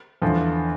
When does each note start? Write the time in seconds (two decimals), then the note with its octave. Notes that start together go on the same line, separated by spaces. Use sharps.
0.22 E2 D3 F3